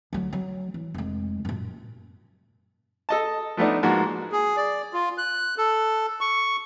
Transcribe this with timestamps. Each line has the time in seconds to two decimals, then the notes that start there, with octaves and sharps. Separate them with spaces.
0.13 D2 F#3
0.33 F#3
0.74 E3
0.94 F1 G#3
1.45 F#2 A#2
3.09 A4 D#5 A5
3.57 F3 A3 B3 D4 D#4
3.83 G#2 F3 A#3 F#4
4.31 G#4
4.57 D5
4.93 F4
5.18 F#6
5.58 A4
6.21 C#6